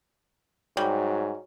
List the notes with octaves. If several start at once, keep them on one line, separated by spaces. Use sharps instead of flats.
G#2 F#3 G3